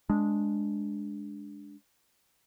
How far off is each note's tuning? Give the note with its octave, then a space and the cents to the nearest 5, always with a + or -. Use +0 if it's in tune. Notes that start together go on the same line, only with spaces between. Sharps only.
G#3 +0 D4 -5